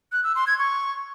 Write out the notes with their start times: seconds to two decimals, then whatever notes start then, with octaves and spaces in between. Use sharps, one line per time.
0.12 F#6
0.24 E6
0.35 C6
0.47 G#6
0.59 C#6